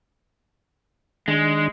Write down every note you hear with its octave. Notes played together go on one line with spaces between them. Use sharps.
D#3 G#3 D4